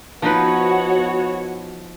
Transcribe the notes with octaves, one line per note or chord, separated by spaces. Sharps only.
F3 B3 D#4 F#4 B4 C#5